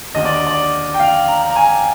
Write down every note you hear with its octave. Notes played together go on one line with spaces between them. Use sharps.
D#2 D3 D#5
D5
D5
G5
F5
A#5
A#5
G#5